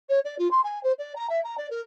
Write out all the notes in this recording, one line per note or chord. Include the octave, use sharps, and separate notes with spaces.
C#5
D5
F4
C6
G#5
C5
D5
A#5
E5
A#5
D5
A#4